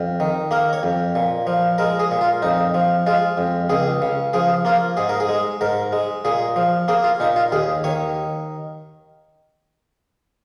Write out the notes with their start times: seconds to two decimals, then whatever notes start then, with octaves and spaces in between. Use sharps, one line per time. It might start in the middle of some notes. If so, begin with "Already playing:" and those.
Already playing: F2
0.20 D#3
0.51 A#3 A#4
0.73 C#5
0.83 F2
1.15 A#2
1.47 F3
1.78 G#3 A#4
2.00 G#4
2.11 A#2
2.21 F4
2.42 F2 D#4
2.74 F3
3.07 G#3 F4
3.38 F2
3.70 C#2 G#4
4.02 C#3
4.33 F3 G#4
4.65 A#3 F4
4.97 G#2 G#4
5.09 A#4
5.20 G#4
5.29 G#3
5.61 G#2 A#4
5.93 G#3
6.25 A#2 G#4
6.56 F3
6.88 A#3 G#4
7.04 F4
7.20 A#2 D#4
7.36 F4
7.52 D#2 G#4
7.84 D#3 C#5